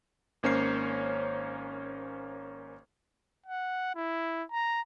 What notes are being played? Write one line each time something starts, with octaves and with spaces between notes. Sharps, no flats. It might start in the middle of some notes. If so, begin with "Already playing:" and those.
G#1 A#3 C#4 C5 C#5 C7
F#5
E4
A#5